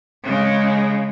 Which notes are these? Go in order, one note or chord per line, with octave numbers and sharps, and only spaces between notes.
C#3 G#3